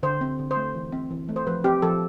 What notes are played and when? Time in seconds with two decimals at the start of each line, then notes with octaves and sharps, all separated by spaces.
0.03 D3 C5
0.21 C4
0.39 D3
0.51 C5
0.57 A3
0.75 E3
0.92 C4
1.11 E3
1.29 A3
1.36 C5
1.47 F3 B4
1.64 C4 G4
1.82 F3 A4